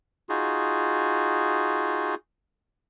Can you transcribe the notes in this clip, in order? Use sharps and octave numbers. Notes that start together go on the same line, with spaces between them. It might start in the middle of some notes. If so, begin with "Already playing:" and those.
D#4 F4 F#4 G#4